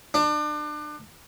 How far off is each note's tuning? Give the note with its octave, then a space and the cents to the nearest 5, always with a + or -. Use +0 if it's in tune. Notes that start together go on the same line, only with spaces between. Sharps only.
D4 +30